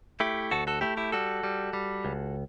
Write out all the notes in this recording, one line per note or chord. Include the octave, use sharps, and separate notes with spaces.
A3 E4 G4
D2 F#4 A4
F#4 A4
A3 E4 G4
E4 G4
G3 F#4 A4
G3
G3
C#2